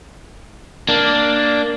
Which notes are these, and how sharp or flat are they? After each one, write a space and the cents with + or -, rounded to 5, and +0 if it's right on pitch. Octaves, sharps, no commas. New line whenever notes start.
A#3 +0 D4 +0